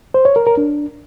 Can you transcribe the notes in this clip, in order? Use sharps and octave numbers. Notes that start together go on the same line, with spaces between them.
C5
C#5
A#4
A#4
D4